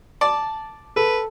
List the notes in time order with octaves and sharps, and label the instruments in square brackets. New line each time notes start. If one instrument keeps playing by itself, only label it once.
[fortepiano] D5 [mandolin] A5
[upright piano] A4 [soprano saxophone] B4